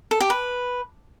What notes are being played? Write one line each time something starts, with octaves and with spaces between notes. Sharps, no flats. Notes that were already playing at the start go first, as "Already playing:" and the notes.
A4
G4
B4